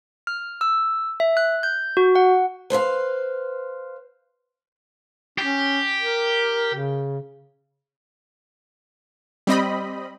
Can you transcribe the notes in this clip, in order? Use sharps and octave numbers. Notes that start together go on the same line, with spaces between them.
F6
E6
E5
F#6
G6
F#4
F#5
B4 C5 D#5 F5
C#4 G4
A#4
C#3
G3 C4 D#5 B5